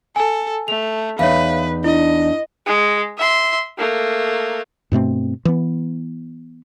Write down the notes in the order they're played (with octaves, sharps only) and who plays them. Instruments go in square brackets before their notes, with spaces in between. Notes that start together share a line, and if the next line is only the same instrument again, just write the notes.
[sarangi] A4 [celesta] G#5
[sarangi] A3 [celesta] F7
[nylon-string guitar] E2 D#4 [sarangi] B4 [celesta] C#5 E5 F5
[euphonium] D4 [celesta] E4 [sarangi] D#5
[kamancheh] G#3
E5 C6
A3 A#3
[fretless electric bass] G2 B2 A3 C4
E3 B3